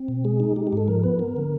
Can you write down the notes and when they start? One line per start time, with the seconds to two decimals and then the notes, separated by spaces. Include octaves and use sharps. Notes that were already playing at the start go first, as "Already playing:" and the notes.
Already playing: C4
0.08 B2
0.24 G#3 G#4
0.40 D#4
0.56 G#3 G4
0.67 G4
0.73 G#2 A4
0.88 F3 A#4
1.03 B3 B4
1.19 B3 A#4
1.36 D3